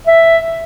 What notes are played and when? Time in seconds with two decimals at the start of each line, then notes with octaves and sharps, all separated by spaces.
0.07 E5